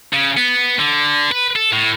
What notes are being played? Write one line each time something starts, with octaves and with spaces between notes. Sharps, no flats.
C#3
B3
D3
B4
A4
A2